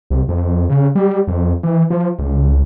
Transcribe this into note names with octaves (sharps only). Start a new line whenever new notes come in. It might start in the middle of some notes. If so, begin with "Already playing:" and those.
C2
F2
C#3
G3
F2
E3
F3
C#2